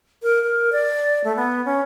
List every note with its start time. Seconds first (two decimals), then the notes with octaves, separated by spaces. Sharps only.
0.23 A#4
0.44 A#4
0.72 D5
1.24 A3
1.36 B3
1.65 C#4